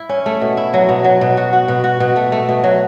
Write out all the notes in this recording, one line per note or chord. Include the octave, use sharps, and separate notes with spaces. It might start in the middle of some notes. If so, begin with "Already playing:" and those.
Already playing: E4
C#4
A3
B2
E4
F#3
B2
F#3
B2
F#4
F#4
B2
F#4
B2
A3
A3
B2
F#3